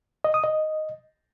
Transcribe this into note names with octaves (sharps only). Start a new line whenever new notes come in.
D#5
D#6
D#5